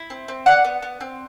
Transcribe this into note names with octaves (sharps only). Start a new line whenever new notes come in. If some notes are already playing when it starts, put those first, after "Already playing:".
Already playing: E4
C4
C4
B3 D5 F#5
B3
B3
C4